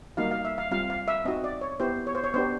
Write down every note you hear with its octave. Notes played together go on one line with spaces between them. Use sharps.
G3 A#3 D#4 F#4 F5
F5
E5
F5
G3 C4 F4 F5
F5
E5
C4 D#4 F#4 D#5
D5
C#5
B3 E4 G4 C5
C#5
C5
C#5
B3 D4 G4 C5